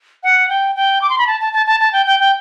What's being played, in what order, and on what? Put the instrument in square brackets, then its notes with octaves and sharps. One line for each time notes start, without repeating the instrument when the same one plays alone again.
[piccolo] F#5
G5
G5
D6
C6
B5
A5
A5
A5
A5
A5
G5
G5
G5